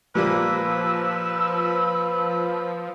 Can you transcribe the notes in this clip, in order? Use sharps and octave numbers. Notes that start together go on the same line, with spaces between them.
A#2 F3 G3 A#3 B4 E6